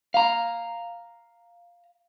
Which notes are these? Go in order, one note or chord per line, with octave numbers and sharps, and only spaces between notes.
F5 A#5